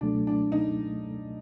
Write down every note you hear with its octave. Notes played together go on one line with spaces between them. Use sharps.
C#2 B2 F#3 A3 D4
D4
D#4